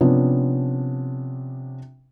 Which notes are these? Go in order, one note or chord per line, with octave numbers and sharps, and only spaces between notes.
C3 F3 B3 C#4 D4